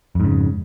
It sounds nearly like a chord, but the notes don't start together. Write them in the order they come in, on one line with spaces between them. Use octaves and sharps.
F2 G#2 C#3